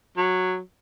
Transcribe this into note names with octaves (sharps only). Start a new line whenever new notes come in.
F#3